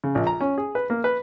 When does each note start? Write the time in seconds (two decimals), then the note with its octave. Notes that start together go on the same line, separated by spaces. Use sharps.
0.04 C#3
0.15 A#1
0.27 A#5
0.41 C#4
0.58 G#4
0.75 B4
0.90 A#3
1.04 B4